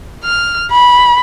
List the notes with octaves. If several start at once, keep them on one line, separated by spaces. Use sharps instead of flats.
F6
B5